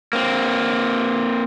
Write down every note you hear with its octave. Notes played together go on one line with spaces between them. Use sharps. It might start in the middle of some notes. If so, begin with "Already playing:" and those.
A#3 C4